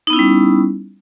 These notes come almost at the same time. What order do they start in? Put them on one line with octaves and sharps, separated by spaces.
D#4 B3 E4 C#4 G3